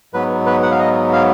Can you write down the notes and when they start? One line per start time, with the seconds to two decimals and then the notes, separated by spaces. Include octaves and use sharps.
0.14 G#2 F#3 B3 B4
0.46 B4
0.63 F#5
0.71 F5
0.79 D#5
1.13 F5